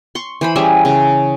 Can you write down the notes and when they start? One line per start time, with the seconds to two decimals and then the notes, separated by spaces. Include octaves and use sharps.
0.15 C6 C#6
0.41 E3 C5 B5
0.56 G3 C#4 G#4 E5
0.85 C#3